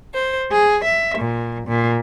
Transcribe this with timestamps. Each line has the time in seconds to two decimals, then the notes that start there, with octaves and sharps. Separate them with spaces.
0.14 C5
0.51 G#4
0.84 E5
1.19 A#2
1.68 A#2